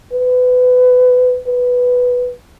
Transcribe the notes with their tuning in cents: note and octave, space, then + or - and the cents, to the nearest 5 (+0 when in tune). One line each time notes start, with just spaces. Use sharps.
B4 +25
B4 +0